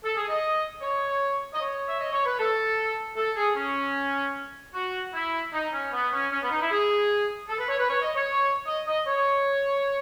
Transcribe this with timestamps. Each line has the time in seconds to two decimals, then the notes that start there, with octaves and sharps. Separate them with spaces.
0.03 A4
0.16 G#4
0.29 D#5
0.81 C#5
1.53 D#5
1.60 C#5
1.86 E5
2.00 D#5
2.12 C#5
2.25 B4
2.38 A4
3.17 A4
3.36 G#4
3.56 C#4
4.74 F#4
5.13 E4
5.53 D#4
5.73 C#4
5.92 B3
6.12 C#4
6.31 C#4
6.41 B3
6.51 D#4
6.60 E4
6.71 G#4
7.49 A4
7.59 B4
7.69 C#5
7.79 B4
7.88 C#5
8.02 D#5
8.15 C#5
8.66 D#5
8.86 D#5
9.07 C#5